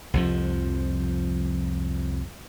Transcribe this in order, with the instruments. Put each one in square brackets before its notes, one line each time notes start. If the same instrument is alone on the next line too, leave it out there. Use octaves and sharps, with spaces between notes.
[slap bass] C2 F2 F3